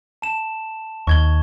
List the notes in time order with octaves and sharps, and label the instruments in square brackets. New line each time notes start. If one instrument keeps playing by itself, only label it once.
[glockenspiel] A5 E7
[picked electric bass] D#2 [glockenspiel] C#6 G#6 G7